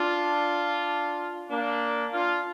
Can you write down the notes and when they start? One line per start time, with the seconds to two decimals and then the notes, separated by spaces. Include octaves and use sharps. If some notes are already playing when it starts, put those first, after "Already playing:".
Already playing: D4 F4
1.50 A#3 D4
2.13 D4 F4